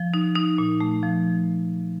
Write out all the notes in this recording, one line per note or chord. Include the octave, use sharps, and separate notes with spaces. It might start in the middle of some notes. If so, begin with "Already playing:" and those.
Already playing: F3
D#4
D#4
A#2
A3
F3